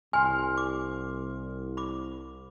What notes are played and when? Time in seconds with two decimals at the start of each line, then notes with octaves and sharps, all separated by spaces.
0.13 C2 G#5 C6 F6
0.57 D6
1.77 B5 D6